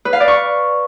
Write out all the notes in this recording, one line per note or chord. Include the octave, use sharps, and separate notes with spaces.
B4
F5
D5
C#6